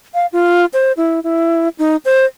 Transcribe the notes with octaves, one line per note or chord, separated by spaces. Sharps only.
F5
F4
C5
E4
E4
D#4
C5